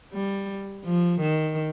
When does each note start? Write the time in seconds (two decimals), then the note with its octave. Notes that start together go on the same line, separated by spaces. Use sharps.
0.13 G3
0.85 F3
1.21 D#3